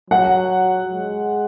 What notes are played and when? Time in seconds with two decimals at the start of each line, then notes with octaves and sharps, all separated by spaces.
0.10 F#3 F#5
0.94 G#3